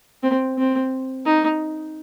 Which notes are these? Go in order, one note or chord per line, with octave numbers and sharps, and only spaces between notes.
C4
C4
D#4